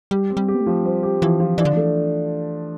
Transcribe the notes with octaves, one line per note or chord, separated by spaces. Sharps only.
G3 G4
C4
G3
G4
B3
A3
F3
G3 C5
G4
E3 F3
F3
E3 D4
D3
E3 A3